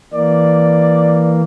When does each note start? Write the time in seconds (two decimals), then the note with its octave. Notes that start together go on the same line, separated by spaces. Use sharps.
0.14 E3 A#3 D5